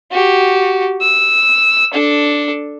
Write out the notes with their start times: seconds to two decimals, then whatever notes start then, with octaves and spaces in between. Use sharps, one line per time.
0.11 F#4 G4
1.01 E6
1.93 D4 A4